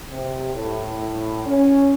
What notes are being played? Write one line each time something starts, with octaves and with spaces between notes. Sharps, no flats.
C3
A2
C#4